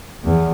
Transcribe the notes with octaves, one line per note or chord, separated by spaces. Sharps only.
E2